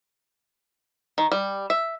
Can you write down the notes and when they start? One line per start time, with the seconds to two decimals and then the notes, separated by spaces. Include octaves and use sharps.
1.18 D#3
1.32 G3
1.70 E5